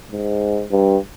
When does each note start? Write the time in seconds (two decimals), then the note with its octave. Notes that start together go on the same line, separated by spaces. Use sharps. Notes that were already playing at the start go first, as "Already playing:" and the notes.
0.11 G#2
0.71 G2